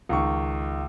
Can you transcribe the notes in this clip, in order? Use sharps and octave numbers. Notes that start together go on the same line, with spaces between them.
C#2 D#3 C#6